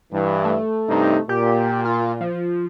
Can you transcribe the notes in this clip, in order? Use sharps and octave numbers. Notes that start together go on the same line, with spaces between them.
G2 E3
A3
G2 C3 D#4
A#2 G4
F4
F3